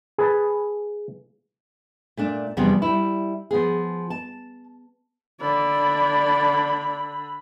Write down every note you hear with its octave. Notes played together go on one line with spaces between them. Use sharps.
G#4 B4 A5
A#2 A3 D4
E2 C3 F3 G3 B3 D4
G3 E4
F3 B3 G#4
A5
D3 D5 B5